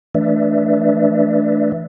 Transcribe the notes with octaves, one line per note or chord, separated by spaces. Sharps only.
E3 A3 D4 B4 D5 E5